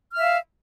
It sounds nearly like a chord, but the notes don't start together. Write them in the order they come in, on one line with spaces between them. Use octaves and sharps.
F6 E5 F5